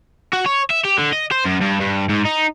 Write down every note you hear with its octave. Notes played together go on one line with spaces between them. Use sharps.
F#4
C#5
E5
G4
D3
D#5
C5
F#2
G2
G2
G#2
D#4